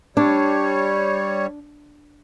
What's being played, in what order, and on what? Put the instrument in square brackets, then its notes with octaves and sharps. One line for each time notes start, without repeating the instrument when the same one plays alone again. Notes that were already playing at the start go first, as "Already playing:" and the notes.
[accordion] G3 C#5 [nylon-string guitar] D4